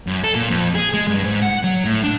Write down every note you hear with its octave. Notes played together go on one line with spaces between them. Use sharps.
F#2
A4
A#2
F2
G#4
G#3
G2
G#2
F#5
F#3
A2
D4